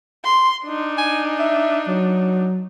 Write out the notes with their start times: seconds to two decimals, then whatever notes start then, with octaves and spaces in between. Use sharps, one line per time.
0.24 C6
0.64 D4 D#4
0.98 G#5
1.39 E5
1.87 F#3